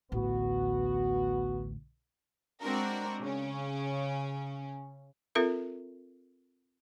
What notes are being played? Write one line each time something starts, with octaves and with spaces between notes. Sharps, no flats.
A1 D2 B3 F#4
G#3 C4 D4 F#4 A#4
C#3 C#4
C4 F4 A4 A#4 E5